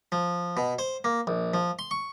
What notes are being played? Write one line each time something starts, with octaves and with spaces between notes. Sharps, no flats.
F3
B2
C5
A#3
A#1
F3
C6
C#6